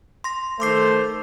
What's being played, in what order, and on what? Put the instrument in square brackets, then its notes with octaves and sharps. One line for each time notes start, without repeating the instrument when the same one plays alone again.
[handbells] C6 A#6
[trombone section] D#3 A3 [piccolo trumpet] C5 [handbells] C6 D6 C7